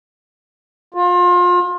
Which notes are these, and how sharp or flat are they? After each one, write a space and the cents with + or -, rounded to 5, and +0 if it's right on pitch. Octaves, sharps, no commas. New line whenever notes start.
F4 +30